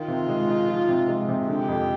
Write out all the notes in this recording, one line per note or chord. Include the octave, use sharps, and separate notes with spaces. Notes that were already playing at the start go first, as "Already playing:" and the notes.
Already playing: D#3 F4
C3
G#3
D#4
F3
C3
G#3
C3
D3 G4
F2